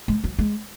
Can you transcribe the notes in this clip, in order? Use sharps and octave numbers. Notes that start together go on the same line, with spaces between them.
G#3
F#3
G#3